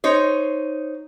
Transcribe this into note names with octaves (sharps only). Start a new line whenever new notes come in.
D#4 C5 C#5